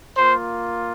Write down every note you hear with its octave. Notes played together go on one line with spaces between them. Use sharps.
A#3 F4 C5